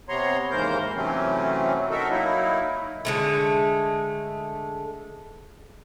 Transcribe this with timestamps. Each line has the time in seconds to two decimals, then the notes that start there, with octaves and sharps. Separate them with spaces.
0.09 C3 B3 C#5 A#5 C6
0.51 D#2 G#2 E3 A#4 C5 G6
0.96 C3 E3 F#3 A3 C4 C#4
1.91 D#4 F#4 A4 A#4 E5
2.11 F#3 A#3 D#4 E4
3.05 D3 G#3 A3